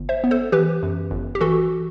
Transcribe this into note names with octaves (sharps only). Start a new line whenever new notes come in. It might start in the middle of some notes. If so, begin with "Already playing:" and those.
Already playing: G1
C5 E5
B3
A4 C5
E3 G4 B4
F#2
G1
G4
E3 F#4 A4